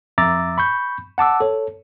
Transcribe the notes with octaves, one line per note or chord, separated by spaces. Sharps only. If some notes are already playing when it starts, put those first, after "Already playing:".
F2 E5 A#5 D6 E6 A6
B5 C#6 G6
F#5 A5 D6 E6
A4 C#5